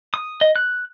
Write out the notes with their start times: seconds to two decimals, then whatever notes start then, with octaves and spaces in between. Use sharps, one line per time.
0.14 D#6
0.41 D#5
0.56 F#6